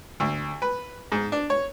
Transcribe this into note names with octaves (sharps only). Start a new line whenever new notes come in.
D2
B4
G#2
D4
C#5